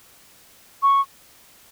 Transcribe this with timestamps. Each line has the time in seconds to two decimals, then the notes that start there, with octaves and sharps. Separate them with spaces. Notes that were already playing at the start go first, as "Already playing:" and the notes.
0.83 C#6